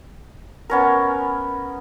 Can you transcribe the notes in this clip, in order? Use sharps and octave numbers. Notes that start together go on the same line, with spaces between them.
B3 C#4 A#4